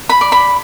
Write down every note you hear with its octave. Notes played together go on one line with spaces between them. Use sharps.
B5
D5
B5